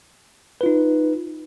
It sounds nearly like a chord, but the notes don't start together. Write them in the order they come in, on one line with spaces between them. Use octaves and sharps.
B4 F4 D#4